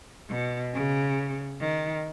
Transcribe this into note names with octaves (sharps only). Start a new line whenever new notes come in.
B2
C#3
D#3